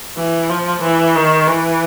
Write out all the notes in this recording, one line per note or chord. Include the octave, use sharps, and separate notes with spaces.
E3
F3
E3
D#3
E3